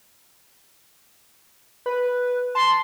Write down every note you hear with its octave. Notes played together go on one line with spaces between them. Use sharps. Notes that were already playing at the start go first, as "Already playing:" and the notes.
B4
A5 C6